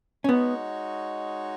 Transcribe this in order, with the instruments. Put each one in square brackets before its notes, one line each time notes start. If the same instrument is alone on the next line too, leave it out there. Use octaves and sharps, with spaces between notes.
[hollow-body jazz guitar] C#4
[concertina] G#3 D#4 F#4 C#5 [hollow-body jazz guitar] B3